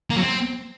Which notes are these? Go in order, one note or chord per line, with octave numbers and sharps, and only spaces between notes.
A#3
F#3
C4